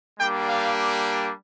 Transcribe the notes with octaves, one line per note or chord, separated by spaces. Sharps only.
G3 A#3 D4 G4 G5
F5